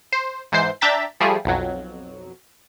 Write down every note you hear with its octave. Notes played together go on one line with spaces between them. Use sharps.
C5
G#2 E3 C5 C7
D4 E5 G5 A#5 A6 B6
F3 G3 A3 G#4
B1 F2 F#3